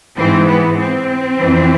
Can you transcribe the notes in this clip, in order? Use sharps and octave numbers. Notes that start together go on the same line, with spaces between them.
G#2 E3 C4
B3
C4
F2 E3